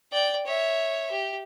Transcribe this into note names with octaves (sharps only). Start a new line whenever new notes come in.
D5 G5
C#5 E5
G4